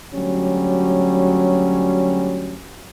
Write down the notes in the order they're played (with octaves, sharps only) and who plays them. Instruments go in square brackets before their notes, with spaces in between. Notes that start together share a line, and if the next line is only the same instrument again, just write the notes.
[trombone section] D2 F#3 G3 C#4